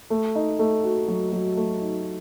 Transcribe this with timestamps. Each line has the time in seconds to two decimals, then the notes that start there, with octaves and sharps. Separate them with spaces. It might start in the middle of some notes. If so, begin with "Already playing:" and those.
0.10 A3
0.35 D#4
0.59 A3
0.84 F#4
1.08 F#3
1.33 F#3
1.57 A3
1.81 D#4